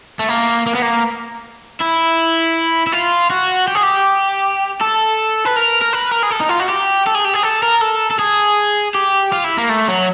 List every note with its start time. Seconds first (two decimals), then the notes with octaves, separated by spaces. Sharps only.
0.19 A3
0.29 A#3
0.66 A#3
0.75 B3
0.82 A#3
1.80 E4
2.87 E4
2.92 F4
3.30 F#4
3.68 G4
3.75 G#4
3.83 G4
4.81 A4
5.45 B4
5.56 A#4
5.82 A#4
5.93 B4
6.12 A#4
6.23 G#4
6.31 A4
6.40 D#4
6.49 F4
6.60 F#4
6.69 G4
7.07 A4
7.15 G#4
7.25 G4
7.34 G#4
7.43 A4
7.63 A#4
7.81 A4
8.11 A4
8.19 G#4
8.95 G4
9.32 F4
9.44 E4
9.57 A#3
9.69 A3
9.88 F#3